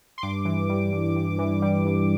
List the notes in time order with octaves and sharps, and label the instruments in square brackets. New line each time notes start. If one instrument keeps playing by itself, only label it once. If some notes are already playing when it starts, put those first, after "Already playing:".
[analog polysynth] C6
G2 D6
E3
G3
G2
G2
E3
G3
G2